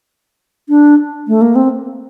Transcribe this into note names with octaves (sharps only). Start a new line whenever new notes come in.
D4
A3
A#3
C4